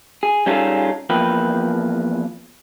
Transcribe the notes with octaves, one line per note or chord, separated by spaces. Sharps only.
G#4
G3 C#4 D#4 F4 G#4 A4
E2 F3 A#3 B4 G5